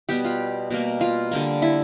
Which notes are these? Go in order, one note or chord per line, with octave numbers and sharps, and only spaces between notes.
B2 G3 B3 G4
F4
B2 G3 A#3
F4
D3 G3 A#3
E4